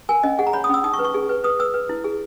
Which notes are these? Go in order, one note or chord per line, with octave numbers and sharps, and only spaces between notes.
A#4 G#5
C#4 D#5
G#4 F#5
A#5
C#5 B5
D#6
C#4 E6
D#4 D#6
C#6
B4
C#6
G#4
B4
B4 D#6
B4 E6
B4
E4
G#4